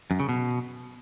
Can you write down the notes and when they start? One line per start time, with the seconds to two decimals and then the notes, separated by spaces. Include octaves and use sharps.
0.11 F#2
0.20 C#3
0.29 B2